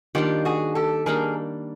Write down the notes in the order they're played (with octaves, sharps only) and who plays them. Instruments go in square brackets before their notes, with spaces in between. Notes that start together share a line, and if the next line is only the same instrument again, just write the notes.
[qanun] D#3 G3 A#3 D4 [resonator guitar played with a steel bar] F4 G4
[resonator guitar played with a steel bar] F#4 G#4
G4 A4
[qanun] D#3 G3 A#3 D4 [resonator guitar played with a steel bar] G#4 A#4